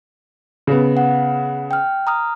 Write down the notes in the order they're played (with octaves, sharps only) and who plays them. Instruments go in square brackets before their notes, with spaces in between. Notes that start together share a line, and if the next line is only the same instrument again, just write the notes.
[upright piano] C#3 B3
[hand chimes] F#5
G5 F6
A#5 D#6 F6